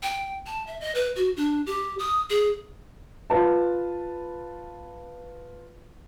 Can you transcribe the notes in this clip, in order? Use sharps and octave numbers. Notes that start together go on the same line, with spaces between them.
G5
A5
E5
D#5
B4
F#4
D4
G4
D#6
G#4
F4 B4 A5